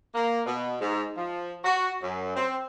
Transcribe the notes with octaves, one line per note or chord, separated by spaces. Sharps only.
A#3
B2
G#2
F3
F#4
F#2
C4